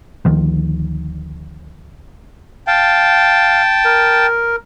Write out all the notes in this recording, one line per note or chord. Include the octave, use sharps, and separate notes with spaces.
D2 D#3 F3
F5 G5 A5
A#4